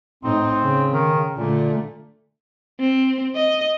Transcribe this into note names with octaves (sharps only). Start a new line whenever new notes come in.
A2 C4 D#4
C#3
D#3
A#2 D3 A3
C4
D#5